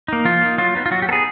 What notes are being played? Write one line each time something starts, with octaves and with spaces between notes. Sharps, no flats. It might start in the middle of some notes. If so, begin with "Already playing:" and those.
A#3 D#4
F3 F4
A#3 D#4
F#3 F4
B3 D#4
F4
F#3 F#4
G4
B3 D#4 G#4 A4